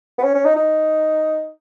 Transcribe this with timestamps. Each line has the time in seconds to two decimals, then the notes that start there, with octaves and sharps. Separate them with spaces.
0.18 B3
0.24 C#4
0.35 C#4
0.45 D#4
0.56 D#4